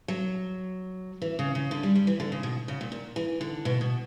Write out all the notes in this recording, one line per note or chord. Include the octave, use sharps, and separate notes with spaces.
F#3
E3
C#3
C#3
D3
G3
G3
E3
D3
C#3
B2
C#3
A#2
A#2
E3
D3
B2
B2